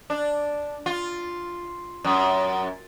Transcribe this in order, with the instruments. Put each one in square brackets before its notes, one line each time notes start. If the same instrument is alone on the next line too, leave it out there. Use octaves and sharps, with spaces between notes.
[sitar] D4
F4
F#2